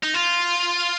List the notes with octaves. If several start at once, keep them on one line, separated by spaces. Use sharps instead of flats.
D#4
F4